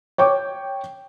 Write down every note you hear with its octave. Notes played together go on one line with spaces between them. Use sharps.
C#5 G5 C#6 D6